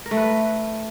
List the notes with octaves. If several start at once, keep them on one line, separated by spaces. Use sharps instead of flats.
A#4
A3
B4